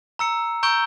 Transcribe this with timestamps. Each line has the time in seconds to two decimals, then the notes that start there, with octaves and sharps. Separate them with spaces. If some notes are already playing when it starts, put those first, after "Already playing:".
0.19 A#5 E6 C#7
0.63 A#5 C#6 E6 G6 D7 G7